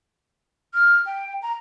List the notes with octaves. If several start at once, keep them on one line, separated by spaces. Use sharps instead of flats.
F6
G5
A#5